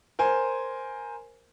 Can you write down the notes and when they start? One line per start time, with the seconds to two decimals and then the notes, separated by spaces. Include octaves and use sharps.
0.19 A#4 C5 G#5